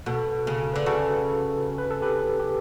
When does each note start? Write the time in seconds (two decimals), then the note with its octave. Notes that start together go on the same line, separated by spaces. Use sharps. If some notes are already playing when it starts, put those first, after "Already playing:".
0.06 B2 F#4 A4
0.47 C#3
0.74 D3 B4
0.86 C#3 F#4 A4
1.78 B4
1.90 A4
2.02 G4 B4
2.40 G4